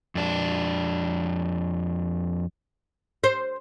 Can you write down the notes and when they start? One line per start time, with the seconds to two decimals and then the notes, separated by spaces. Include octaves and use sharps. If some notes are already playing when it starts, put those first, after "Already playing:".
0.15 F2 D4
3.24 C5